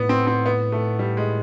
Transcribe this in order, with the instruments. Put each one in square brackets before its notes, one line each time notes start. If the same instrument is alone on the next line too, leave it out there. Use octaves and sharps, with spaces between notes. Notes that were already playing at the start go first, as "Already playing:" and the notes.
Already playing: [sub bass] A2 [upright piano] B3
[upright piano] C4
C4
B3
A3
G3
G#3